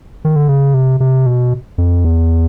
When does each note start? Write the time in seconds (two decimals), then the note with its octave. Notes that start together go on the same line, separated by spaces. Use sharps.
0.25 D#3
0.36 D3
0.48 C#3
0.74 C3
1.00 C3
1.26 B2
1.78 F2
2.04 E2